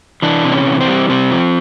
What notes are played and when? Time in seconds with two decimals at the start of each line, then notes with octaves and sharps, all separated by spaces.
0.22 E3 D4
0.44 C3
0.52 C#4
0.67 E3
0.81 C4
0.88 G3
1.09 C3 C4
1.31 F3